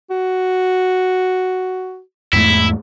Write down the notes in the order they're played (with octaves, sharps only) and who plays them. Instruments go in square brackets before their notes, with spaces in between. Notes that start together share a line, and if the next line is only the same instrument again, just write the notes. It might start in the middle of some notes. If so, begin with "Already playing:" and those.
[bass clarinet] F#4
[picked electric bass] E2 G#2 A3 [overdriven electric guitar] E4